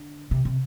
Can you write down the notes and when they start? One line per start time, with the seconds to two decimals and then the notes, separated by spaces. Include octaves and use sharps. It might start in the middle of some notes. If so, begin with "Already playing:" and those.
Already playing: D3
0.31 C3
0.45 C3